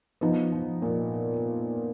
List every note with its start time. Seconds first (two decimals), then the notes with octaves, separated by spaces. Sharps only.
0.21 F3 B3 D#4
0.52 F3
0.82 A#2